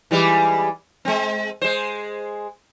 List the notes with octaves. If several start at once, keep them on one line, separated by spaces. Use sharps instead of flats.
E3 G3 G#3
G#3 C4
G#3 C5